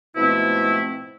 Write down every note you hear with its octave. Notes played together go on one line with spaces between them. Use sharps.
G#2 B2 F3 A3 C4 E4